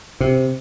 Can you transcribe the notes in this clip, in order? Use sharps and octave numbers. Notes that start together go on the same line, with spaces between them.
C3